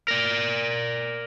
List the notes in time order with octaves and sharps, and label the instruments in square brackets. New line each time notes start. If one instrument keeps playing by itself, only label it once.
[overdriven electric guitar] A#4 D5